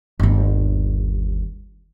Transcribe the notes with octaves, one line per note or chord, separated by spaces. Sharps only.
G1 D#2